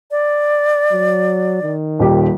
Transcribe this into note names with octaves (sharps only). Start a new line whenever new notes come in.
D5
F#3
D#3
D#1 G4